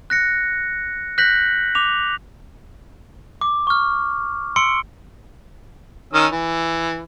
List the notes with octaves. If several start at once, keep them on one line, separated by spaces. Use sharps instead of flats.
F#6 A#6 C#7
F#6 G6 A#6 B6 F#7
D6 F7
D6
C#6 F6
C6 E6 C#7 D7 G7
D#3 C#4 E6
E3